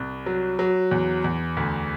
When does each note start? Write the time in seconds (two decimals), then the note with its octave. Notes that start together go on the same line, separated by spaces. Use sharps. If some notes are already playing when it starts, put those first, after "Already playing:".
Already playing: C2
0.26 F#3
0.59 F#3
0.91 E2
1.24 E2
1.57 D2